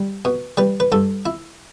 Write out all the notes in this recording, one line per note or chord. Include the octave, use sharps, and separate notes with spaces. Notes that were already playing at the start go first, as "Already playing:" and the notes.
Already playing: G3
B2
G3 B4
B4
G2 A4
E4